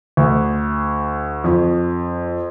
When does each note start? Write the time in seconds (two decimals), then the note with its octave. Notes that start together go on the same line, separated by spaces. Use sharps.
0.17 D2
1.44 F2